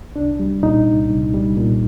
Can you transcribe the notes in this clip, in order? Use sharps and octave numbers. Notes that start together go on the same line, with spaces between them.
C2 D4
G3
A#2 D#4
C2
C2
G3
A#2